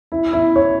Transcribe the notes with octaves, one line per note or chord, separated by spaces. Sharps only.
E4
E4
C#5